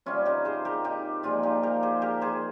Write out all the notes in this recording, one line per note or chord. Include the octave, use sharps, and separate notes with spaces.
C3 G3 C#4 F4
D#4 G4
G#4 C5
G4 A#4
D#4 G4
A#2 F3 G#3 F4 G#4
D#4 G4
G4 A#4
G#4 C5
G4 A#4
G#4 C5